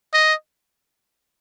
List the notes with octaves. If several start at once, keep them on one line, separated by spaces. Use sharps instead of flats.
D#5